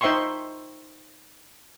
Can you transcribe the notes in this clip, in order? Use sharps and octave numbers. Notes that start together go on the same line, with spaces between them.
D#4 C5 E5 G5 C6 C#6